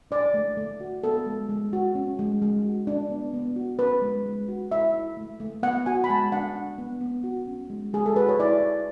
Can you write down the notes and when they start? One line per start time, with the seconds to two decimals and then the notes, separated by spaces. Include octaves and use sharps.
0.11 D4 D5
0.34 A3
0.57 A3
0.80 F#4
1.04 B3 A4
1.26 G#3
1.49 G#3
1.73 F#4
1.95 C#4
2.19 G#3
2.42 G#3
2.64 F#4
2.87 D4
3.10 B3
3.34 B3
3.56 F#4
3.79 C#4 B4
4.02 G#3
4.26 G#3
4.48 F#4
4.72 E4 E5
4.94 E4
5.17 A3
5.40 A3
5.63 B3 F#5
5.86 F#4 G#5
6.04 B5
6.10 G#3 A5
6.32 D4 F#5
6.55 D4
6.78 B3
7.01 B3
7.24 F#4
7.47 C#4
7.70 G#3
7.93 G#3 G#4
8.06 A4
8.16 F#4 B4
8.29 C#5
8.39 E4 D5
8.62 E4